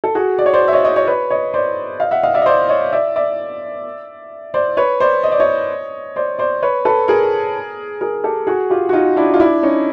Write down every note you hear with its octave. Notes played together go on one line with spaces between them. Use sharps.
A4
F#4 G#4
D5
C#5
C5 D5
E5
C#5 D#5
C#5 D#5
C#5 D#5
B4 C#5
C#5 D#5
C5 D5
D#5 F5
E5 F#5
D#5 F5
D5 E5
D#5
C5 D5
C#5 D#5
D5 E5
D5 E5
C5 D5
B4 C#5
C5 D5
D#5
D5
C#5 D#5
C5 D5
C5 D5
B4 C#5
A4 B4
G#4 A#4
G#4 A#4
G4 A4
F#4 G#4
F4 G4
F#4
D#4 F4
D4 E4
F4
D4 E4
C#4 D#4